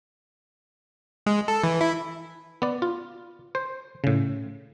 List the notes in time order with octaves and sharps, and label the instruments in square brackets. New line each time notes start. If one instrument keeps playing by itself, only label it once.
[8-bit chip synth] G#3
A4
E3
E4
[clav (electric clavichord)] B3 D5
F4
C5
A2 C#3